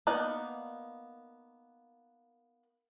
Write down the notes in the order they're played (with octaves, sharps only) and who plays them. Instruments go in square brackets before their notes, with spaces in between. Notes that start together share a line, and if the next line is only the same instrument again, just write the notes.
[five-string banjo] A#3 B3 D#4 D5 F#5